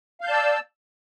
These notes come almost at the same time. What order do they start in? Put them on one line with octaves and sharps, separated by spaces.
F5 G6 A5 D5 E6